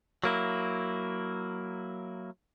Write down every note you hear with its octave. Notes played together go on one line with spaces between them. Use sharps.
F#3 A#3 E4